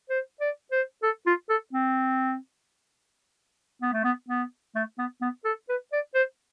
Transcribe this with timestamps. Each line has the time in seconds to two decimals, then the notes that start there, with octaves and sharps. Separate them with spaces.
0.10 C5
0.40 D5
0.72 C5
1.03 A4
1.27 F4
1.49 A4
1.73 C4
3.82 B3
3.93 A3
4.04 B3
4.29 B3
4.75 A3
4.99 B3
5.22 B3
5.45 A4
5.69 B4
5.93 D5
6.15 C5